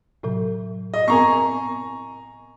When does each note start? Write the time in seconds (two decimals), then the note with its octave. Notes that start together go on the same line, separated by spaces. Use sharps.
0.23 A2 C3 F#3
0.94 D#5
1.08 B3 C4 A#4 G#5 A#5 C#6